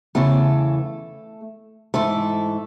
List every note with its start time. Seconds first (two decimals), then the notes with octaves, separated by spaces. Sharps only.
0.15 E2 C#3 E3 A3 A4
1.94 G#2 E3 A3 A4